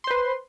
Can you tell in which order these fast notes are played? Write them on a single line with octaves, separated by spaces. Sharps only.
C6 C5 B4